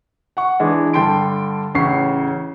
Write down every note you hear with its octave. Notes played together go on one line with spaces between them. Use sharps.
F#5 C#6
E3 G#3 D4
G2 D3 G5 A5 C6 D7
A1 C#3 F#5 C#6 C7